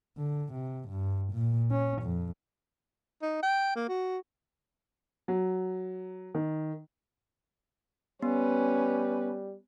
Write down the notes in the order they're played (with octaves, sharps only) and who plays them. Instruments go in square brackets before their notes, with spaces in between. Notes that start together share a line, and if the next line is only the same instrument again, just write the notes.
[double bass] D3
C3
G2
A#2
C#4
F2
[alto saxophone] D#4
G5
A#3
F#4
[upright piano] F#3
D#3
[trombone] G3 [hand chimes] B3 [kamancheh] C#4 B4